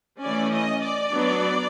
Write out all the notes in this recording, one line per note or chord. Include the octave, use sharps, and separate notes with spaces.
E3 A3 C#4 D5
D#5
D5
F#3 B3 D4